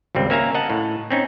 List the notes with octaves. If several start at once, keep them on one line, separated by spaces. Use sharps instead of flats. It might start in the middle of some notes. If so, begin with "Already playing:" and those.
G#1 C#2 G3 C4
A#3 C#4 E5 F5 G#5 A#5
D#5 F#5 A5
A2
C4 C#4 D#4